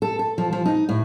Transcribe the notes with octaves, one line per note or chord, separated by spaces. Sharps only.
A4
A4
F3
F3
D#4
A2